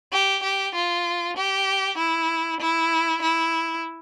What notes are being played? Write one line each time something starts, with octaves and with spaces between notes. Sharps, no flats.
G4
G4
F4
G4
E4
E4
E4